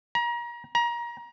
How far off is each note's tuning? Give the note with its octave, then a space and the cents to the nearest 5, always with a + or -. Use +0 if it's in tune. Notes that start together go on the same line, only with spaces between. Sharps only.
A#5 +35
A#5 +30